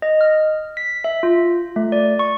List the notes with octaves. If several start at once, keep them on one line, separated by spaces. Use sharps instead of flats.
D#5
F6
B6
E5
F4
A3
D5
C#6